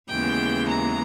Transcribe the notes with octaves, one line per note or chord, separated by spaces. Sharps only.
D#2 C#3 E3 G#3 B3 G5
A#5